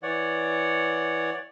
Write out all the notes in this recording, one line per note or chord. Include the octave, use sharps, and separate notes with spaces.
E3 C#5 D5 F#5